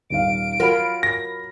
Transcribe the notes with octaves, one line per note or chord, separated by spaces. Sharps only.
D#1 D#3 F5 D7
F#3 F4 A#4 B5
A#6